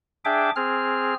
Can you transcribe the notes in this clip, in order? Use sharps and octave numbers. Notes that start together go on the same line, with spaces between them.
D4 G#4 E5 G5 D6
C4 G#4 F6